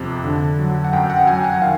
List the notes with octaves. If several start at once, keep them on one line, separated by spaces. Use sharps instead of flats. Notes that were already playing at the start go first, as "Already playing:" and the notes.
Already playing: F2 C3
D3
F#3
F#5
F#2 G5
F#5
F#3 G#5
F#5
D#3 F5